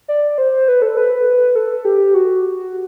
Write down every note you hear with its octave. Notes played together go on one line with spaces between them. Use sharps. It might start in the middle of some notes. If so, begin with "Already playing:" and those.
D5
C5
B4
A4
B4
A4
G4
F#4